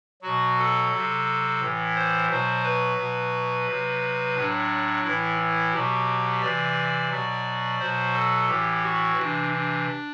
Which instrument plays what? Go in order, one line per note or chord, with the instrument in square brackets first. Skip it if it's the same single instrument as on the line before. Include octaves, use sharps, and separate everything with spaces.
[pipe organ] B2 F#3 F#4
A4
C3 F#3
A2 E3
C5
B2 F#3 C5
B4
B2 F#3
C3 F#3
A2 F#3 D4
A2 E3 E4
E4
B2 F#3 G4
C3 E3 D5
B2 F#3
B2 F#3 C5
A4
A2 E3 G4
F#4
C3 E3 D4
D4